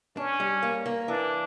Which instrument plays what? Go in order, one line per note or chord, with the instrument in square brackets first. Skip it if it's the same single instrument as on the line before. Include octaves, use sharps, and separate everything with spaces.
[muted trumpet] C#4 [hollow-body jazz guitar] D4
[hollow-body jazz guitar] G3
A#3
A#3
[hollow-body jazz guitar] E3 [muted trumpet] D4